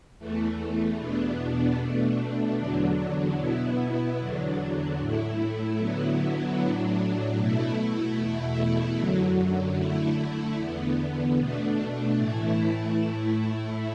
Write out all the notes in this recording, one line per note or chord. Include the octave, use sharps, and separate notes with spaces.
E2 E3 A3
E2 B2 B3 D4
B2 A3 D4
E2 D3 F#3 D4
B2 B3 E4
E2 D3 F#3 D4
A2 A3 E4
D3 F#3 B3 E4
A2 F#3 D4
B2 A3 E4
E2 B2 A3 E4
F#2 D3 F#3
D3 A3 E4
E2 D3 B3
B2 A3 D4
A2 E3 A3 E4
A2 A3 E4